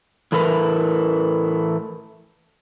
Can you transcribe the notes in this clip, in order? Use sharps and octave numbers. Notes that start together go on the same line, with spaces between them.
A2 E3 A3 E4 A#4 B4